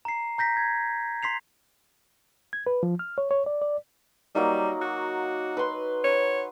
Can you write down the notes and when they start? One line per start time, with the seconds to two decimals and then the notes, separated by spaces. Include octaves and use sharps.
0.05 A#5 C7
0.38 A#5 G6 A#6 B6
0.57 G#6
1.23 C6 B6 C7 F7
2.53 G#6
2.67 B4
2.83 F3
2.99 F6
3.18 C#5
3.31 C#5
3.46 D5
3.62 D5
4.35 F#3 G3 A#3 D#4
4.81 F#4
5.57 B4 C6
6.04 C#5